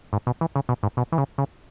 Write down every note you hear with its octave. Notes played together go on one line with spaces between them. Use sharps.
G#2
B2
E3
C#3
B2
G#2
B2
E3
C#3
C#3